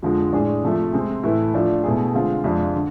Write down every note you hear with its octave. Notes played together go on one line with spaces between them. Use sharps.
F2 D3 F3 G#3
A2 G#3 D4 G#4
C3 F3 A3
C3 G#3 C4 G#4
A2 E3 A3 E4
F3 A3 D4 F4
B2 A3 E4 G#4
D3 G#3 C4 F4 G#4
F2 C3 G#3 D4 F4
D3